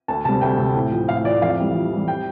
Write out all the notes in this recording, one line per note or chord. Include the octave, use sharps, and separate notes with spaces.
D2 A5
C3 G3 A5
D2 G5
C3 G3
A2
F3
A2 F5
F3 D5
F2 F5
E3 G3
F2
E3 G3
G5